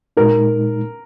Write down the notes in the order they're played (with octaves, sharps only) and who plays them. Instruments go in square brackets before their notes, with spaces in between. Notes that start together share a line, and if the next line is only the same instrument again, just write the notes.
[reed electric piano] A#2 G#3 D#4 [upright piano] A#4